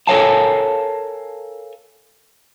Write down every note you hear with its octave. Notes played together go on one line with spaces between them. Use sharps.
A4 A#4 C#5 F5 G#5 A5